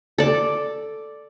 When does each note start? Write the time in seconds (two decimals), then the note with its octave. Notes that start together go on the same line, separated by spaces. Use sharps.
0.18 A4 D5